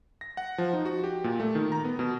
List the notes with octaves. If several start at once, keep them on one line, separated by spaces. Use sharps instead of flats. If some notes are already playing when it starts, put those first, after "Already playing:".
A#6
F#5
F3
D#4
F#4
G4
A#2
A3
D#3
A#5
B3
B2